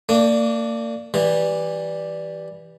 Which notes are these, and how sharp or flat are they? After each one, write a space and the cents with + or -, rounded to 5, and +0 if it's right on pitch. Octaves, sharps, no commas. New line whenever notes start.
A#3 -35 D4 +0
E3 -10 G3 +0